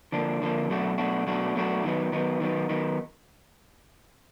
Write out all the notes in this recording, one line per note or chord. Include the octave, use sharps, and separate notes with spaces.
D3 F3 A#3 D4
D3 F3 A#3 D4
B2 F#3 A3 D4 F#4
B2 F#3 A3 D4 F#4
B2 F#3 A3 D4 F#4
B2 F#3 A3 D4 F#4
D#3 F#3 B3 D#4
D#3 F#3 B3 D#4
D#3 F#3 B3 D#4
D#3 F#3 B3 D#4